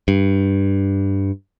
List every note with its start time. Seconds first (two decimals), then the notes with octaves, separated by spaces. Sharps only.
0.08 G2